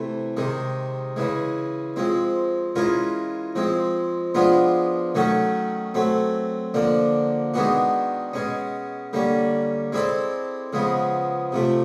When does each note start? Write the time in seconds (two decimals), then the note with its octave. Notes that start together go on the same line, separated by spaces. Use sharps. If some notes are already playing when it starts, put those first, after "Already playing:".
Already playing: C3 E3 A3
0.37 C3 D#3 G#3
1.16 C#3 E3 G#3
1.96 F3 G#3 C4
2.76 E3 G#3 C#4 F4 A#4
3.55 F3 G#3 C4
4.35 F3 G#3 B3 D4 F4
5.15 D#3 F#3 A3 C#4 F#4
5.94 F#3 A3 C4
6.74 D3 F3 A#3 D4
7.54 D#3 G#3 B3 D4 F#4
8.34 B2 G#3 C#4
9.13 D3 G3 A#3 C#4
9.92 G#3 C4 E4 A4 D5
10.73 C#3 F3 G#3 B3
11.52 C3 F3 A3